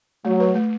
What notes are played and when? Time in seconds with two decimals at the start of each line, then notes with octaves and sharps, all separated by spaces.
0.25 F#3 A3
0.40 B4
0.55 A3